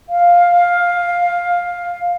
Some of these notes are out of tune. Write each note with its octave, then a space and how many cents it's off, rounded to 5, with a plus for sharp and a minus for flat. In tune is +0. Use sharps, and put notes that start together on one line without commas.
F5 +10